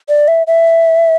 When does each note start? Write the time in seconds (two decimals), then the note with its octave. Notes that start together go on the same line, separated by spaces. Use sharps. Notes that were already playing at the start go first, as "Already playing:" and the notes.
0.09 D5
0.28 E5
0.47 E5